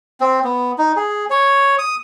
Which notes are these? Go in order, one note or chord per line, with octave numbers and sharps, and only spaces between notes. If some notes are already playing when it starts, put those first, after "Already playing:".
C4
B3
D#4
G#4
C#5
D#6